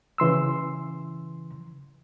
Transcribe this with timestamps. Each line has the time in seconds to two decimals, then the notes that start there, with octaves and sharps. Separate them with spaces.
0.18 C#3 E3 C6 E6